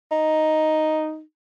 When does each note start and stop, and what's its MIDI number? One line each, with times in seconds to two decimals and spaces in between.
0.12 1.21 63